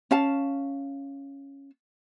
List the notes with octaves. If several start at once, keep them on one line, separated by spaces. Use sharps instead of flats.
C#4 F5 A5